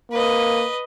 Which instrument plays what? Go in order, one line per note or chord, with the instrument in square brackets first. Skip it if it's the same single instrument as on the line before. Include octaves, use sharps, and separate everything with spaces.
[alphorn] A#3 [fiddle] B4 D#5